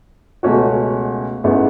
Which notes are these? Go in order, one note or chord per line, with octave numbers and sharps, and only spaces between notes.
C#2 B2 A3 C#4 F#4
A1 G#2 G#3 B3 E4